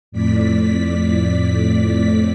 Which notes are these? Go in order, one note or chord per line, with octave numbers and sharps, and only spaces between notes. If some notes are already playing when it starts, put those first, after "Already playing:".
F2 A2 D5 B6